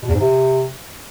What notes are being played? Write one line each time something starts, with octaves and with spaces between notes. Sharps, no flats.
B2
E2
G#2
C3